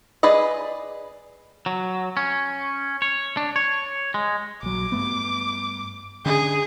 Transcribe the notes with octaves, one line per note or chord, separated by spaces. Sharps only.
G#4 B4 D5 D#5
F#3
C#4
C#5
D4
C#5
G#3
A#1 F#3 D6
G2 A3 B3
D3 C#4 D4 G#4